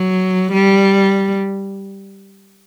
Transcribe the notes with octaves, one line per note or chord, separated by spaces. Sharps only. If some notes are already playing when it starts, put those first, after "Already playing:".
Already playing: F#3
G3